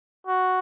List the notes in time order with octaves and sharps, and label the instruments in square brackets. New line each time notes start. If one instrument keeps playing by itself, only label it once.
[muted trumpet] F#4